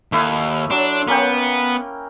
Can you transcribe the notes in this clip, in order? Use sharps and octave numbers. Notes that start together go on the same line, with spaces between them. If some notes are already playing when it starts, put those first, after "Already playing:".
D#2 A3 E4 D#6
F#3 D4 C6
A#3 B3 C#4 G5